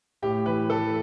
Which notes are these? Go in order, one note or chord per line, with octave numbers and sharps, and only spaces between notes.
A2 G4
E3 B4
E3 A4